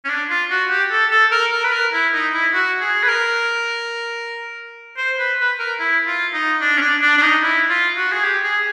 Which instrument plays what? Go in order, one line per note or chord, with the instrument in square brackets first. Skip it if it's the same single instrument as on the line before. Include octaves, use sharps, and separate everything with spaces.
[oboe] C#4
D4
F4
F#4
G4
A4
A4
A#4
A#4
B4
A#4
E4
D#4
E4
F#4
G#4
B4
A#4
C5
B4
B4
A#4
E4
F4
D#4
D4
C#4
D4
D4
D4
D#4
E4
F4
F#4
G#4
G4
G#4